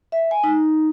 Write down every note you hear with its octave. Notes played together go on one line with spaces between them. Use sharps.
E5
G#5
D#4